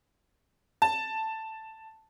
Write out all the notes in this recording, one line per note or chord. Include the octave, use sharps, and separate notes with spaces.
A5